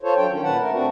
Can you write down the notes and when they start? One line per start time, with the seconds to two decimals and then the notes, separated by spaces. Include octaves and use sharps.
0.03 F4 A4 C5 C#5
0.17 F#3 D4 A4 G5
0.29 D#3 C#4
0.43 A#2 B4 F#5 A5
0.59 A3 A#4
0.72 A3 C4 D4 F#4